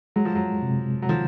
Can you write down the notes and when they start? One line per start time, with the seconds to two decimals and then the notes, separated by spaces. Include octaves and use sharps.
0.16 F#3 G#3
0.25 F3
0.35 F#3
0.63 C3
1.02 F#3
1.09 D#3 F3